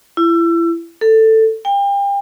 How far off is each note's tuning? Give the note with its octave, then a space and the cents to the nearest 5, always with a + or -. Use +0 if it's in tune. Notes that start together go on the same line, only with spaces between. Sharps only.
E4 +30
A4 +10
G5 +35